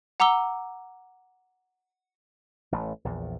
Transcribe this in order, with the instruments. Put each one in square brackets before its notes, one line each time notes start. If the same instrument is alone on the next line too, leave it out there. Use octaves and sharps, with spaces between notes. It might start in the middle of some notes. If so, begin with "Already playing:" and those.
[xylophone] F#5 A#5 D6 E6 G7
[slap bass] A1 A3
A#1 E2